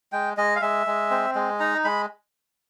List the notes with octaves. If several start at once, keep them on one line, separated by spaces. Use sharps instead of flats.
G#3 G5
G#3 D#5
F5
G#3 E5
G#3
C4
G#3
D#4 A#5
G#3 B5